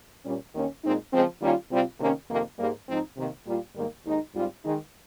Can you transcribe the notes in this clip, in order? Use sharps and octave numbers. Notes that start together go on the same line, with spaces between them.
A#2 G3 C#4
D#2 D#3 A#3 C#4
A#2 G#3 C4 D#4
C#3 F3 G#3 C4
D#3 G3 A#3 C#4 F4
C3 G3 C4 F4
C3 D#3 A#3 C#4
F2 C3 D#3 A#3
G#2 G3 A#3
G#2 F3 C4 D#4
C3 D#3 A#3
A#2 G3 A#3 F4
G#2 D#3 G3 A#3
D#2 D#3 G#3 D#4
G#2 G3 C4 F4
D#3 G#3 D#4